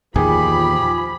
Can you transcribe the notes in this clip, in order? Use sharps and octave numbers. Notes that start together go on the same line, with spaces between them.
E2 A#2 D#3 F3 G4 G#4 B5